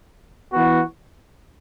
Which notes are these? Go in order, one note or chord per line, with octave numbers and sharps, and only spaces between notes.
E3 B3 F#4